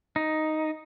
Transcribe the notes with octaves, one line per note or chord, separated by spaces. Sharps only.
D#4